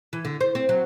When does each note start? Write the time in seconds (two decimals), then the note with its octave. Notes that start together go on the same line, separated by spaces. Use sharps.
0.13 E3
0.25 D3
0.41 C5
0.55 C4
0.69 F#3